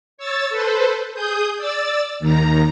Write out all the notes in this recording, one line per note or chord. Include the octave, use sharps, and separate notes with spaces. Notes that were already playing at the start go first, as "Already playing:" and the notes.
C#5 E6 A6
A4 B4 C5
G#4 D#6 G6
D5 E6 A6
D#2 D#3 A#5